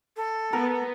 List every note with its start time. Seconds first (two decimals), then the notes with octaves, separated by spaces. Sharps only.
0.17 A4
0.53 B3 A#4